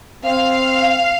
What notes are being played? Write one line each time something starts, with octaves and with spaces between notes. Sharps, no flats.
C4 F5